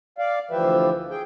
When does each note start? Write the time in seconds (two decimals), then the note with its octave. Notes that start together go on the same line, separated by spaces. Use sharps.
0.18 D5 F5
0.51 D2 E3 F3 G4 B4 E5
1.10 G#4 G5